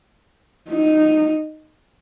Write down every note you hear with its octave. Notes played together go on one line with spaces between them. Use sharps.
D#4